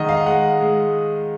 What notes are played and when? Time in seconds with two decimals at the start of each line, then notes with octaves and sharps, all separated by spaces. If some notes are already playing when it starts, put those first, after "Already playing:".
Already playing: D#3 G#3 D#5 F#5
0.09 F5
0.26 G#3 F#5
0.61 G#3